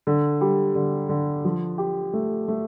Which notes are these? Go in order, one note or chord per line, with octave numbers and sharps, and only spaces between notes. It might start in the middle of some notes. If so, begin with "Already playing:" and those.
D3
G3
D3
D3
F3
G4
A3
A3